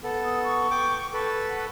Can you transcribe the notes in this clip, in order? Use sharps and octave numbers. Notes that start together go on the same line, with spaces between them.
B3 A4
D#6
C#6
G5 D6
A4 B4 C#6
F#5